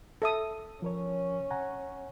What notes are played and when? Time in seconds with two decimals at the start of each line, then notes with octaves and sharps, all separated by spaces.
0.22 A4 E5 D#6
0.82 F3 C#4 A#4 C#5
1.51 F#5 G#5 A#5